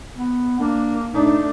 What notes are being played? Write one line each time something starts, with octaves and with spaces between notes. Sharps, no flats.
B3
A#3 D4
A3 D4 D#4